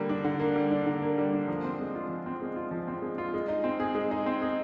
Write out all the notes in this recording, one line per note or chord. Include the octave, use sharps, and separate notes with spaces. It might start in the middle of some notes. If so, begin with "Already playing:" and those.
Already playing: D3 G3 A#3
D4
D3
A#3
G3
D4
D3
A#3
G3
D4
F3
C4
G#3
F4
F3
C4
G#3
F4
F3
C4
G#3
F4
G#3
D#4
C4
G#4
G#3
D#4
C4
G#4